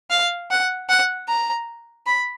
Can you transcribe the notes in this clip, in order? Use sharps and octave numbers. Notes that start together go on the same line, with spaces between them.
F5
F#5
F#5
A#5
B5